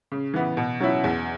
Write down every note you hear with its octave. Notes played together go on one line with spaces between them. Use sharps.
C#3
E3 B3
B2
F#3 C#4 E4
E2